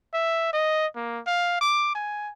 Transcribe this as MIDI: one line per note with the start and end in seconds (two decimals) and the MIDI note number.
0.14 0.48 76
0.53 0.86 75
0.96 1.20 58
1.27 1.59 77
1.61 1.93 86
1.95 2.31 80